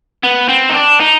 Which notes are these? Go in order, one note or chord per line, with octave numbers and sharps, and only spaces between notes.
B3
C4
D#4
D4
D#4